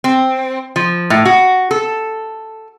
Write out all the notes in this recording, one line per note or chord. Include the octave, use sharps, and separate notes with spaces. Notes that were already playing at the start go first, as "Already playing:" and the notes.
C4
F3
A2
F#4
A4